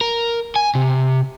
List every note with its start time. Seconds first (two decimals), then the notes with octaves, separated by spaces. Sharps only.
0.01 A#4
0.56 G#5
0.75 C3